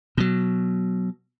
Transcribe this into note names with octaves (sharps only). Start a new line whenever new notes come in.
B2 F#3